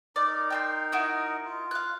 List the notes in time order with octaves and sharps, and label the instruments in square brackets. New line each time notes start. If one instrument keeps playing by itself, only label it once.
[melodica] D#4 A#4 [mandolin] D5
[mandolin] G5 A5 C6
E4 F#4 D#5
[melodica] F4
[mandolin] F5 F#6